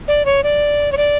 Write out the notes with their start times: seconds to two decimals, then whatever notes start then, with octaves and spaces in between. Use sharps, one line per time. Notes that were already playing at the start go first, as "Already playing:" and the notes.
0.08 D5
0.26 C#5
0.43 D5
0.92 C#5
0.97 D5